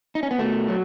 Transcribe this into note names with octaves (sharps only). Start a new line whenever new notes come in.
D#4
C#4
B3
B2 A3
F#3